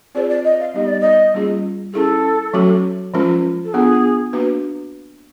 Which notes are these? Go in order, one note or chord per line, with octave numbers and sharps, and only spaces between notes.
C4 F4 G#4 C5 D5
D5
D#5
F5
G3 B3 D#4 G4 D#5
D5
D#5
G3 A#3 C#4 F4 G#4
C#4 E4 G#4 A4
F#3 A3 C#4 F#4 A4
F3 G#3 C#4 F4 A#4
A4
B3 D4 F4 G#4
A#3 D4 F#4 B4